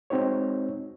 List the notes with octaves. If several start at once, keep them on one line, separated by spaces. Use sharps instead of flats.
G#3 C4 D#4 F#4 C#5